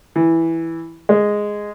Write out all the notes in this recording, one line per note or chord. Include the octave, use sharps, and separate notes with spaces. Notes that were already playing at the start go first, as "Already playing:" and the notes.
E3
G#3